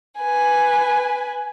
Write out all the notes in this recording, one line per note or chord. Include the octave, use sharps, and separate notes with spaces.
B4 G#5